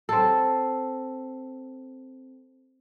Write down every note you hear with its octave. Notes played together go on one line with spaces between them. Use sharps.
C4 A4